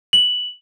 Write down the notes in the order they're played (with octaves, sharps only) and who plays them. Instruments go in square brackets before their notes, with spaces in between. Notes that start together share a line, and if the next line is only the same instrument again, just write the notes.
[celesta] F#7